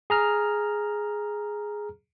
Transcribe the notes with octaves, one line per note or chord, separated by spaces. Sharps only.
G#4 A#5 F6